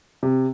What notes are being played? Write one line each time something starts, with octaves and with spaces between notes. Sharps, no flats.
C3